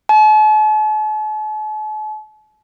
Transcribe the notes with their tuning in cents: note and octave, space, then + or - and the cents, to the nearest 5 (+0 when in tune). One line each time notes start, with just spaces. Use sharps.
A5 -45